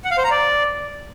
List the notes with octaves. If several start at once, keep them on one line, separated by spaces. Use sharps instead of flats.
F#5
F5
C5
A#5
D5